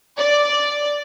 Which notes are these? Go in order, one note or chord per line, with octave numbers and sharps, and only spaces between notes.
D5